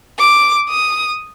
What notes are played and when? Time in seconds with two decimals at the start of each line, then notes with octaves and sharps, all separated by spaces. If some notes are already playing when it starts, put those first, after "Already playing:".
0.19 D6
0.70 D#6